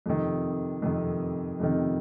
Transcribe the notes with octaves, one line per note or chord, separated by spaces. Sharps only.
F2 C3 D#3
F2 C3 D#3
F2 C3 D#3